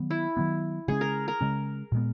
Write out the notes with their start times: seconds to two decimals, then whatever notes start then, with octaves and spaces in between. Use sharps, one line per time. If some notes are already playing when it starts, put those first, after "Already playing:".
Already playing: D#3 F#3 B3
0.10 E4
0.37 D#3 F#3 B3
0.88 C#3 G#3 C#4 G#4
1.01 A#4
1.28 A#4
1.41 C#3 G#3 C#4
1.92 A#2 G#3 B3